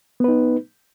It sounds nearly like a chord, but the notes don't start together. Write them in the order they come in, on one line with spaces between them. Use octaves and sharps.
B3 B4 D#4